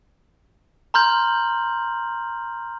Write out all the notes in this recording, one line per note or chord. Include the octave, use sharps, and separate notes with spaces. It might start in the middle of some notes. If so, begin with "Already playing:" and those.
A#5 C6 F6 G6 F#7